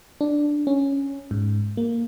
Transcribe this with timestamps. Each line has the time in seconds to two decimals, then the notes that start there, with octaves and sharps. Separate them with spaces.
0.21 D4
0.67 C#4
1.31 G#2
1.77 A#3